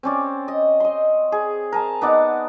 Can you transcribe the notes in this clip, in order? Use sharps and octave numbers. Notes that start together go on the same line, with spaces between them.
C4 C#4 D5
D#5
D#5 C6
G#4
A#4 G#5 A5
B3 D#4 D5 F#5